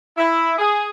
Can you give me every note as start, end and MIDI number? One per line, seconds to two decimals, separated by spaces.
0.18 0.54 64
0.58 0.88 68